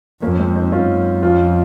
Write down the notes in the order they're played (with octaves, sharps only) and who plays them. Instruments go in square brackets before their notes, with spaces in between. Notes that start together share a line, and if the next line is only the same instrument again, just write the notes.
[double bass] F2 [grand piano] A#3 C#4
[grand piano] G#3 C4
C4 D#4
[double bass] F#2 [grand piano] C#4 F4
[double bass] F2 [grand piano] C#4 F4